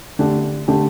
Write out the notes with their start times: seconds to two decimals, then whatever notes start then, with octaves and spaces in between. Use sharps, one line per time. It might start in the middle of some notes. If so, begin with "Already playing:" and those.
0.19 D3 A3 D4 G4
0.68 D3 A3 D4 G4